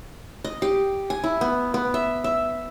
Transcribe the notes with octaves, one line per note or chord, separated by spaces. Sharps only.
D#5
G4
G#5
E4
B3
B3
E5
E5